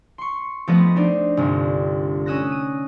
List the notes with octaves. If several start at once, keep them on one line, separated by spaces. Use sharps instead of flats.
C6 C#6
F3 A3 B3 C4 B4 D#5
D4 D#4 C5 D5
G1 C2
C#4 D#6 E6 F#6 A#6
D#7